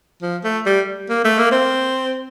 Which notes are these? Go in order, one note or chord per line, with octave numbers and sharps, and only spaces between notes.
F3
A3
G3
A#3
A3
A#3
C4